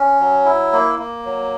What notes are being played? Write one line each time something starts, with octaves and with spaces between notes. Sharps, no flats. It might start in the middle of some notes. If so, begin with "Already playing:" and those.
Already playing: C#4
F#3
E4
A#3
A#3
F#3